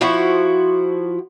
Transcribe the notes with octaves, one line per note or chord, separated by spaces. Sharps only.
F3 E4 F#4